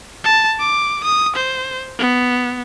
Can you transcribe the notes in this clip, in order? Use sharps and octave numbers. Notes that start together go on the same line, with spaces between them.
A5
D6
D#6
C5
B3